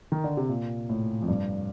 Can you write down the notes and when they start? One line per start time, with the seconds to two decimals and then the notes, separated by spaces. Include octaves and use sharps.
0.12 D#3
0.24 D3
0.37 C3
0.49 A#2
0.89 A2
1.22 F2
1.28 G2